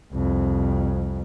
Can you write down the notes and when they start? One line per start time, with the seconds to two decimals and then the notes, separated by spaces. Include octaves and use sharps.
0.12 C2 F2